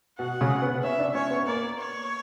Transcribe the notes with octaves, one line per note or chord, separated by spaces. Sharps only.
B2 F#5
C#3
B3
B3
C#4 E5
D4
C#4 C#5
B3
A#3 D5
C#5